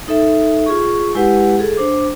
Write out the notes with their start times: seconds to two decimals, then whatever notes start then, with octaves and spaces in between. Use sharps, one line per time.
0.08 D#4 A4 E5
0.66 F4 G#4 C#6
1.15 G#3 E4 G4 B4 F#5
1.59 G#4 A4
1.77 D4 C5 D6